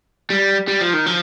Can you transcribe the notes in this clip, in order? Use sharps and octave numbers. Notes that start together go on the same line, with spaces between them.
G3
G3
F3
D#3
F3